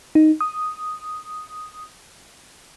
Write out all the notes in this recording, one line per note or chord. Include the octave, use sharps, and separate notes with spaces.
D#4
D#6